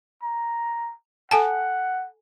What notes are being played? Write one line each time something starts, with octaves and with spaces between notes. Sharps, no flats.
A#5
A4 F#5 G#5 A5